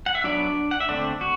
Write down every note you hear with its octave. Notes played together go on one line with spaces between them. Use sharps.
F#5
E5
F#3 B3 D4 D5
F#5
E5
D3 A3 C4 D4 D5
F#4